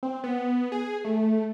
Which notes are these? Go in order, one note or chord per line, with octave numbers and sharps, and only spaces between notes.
C4
B3
G#4
A3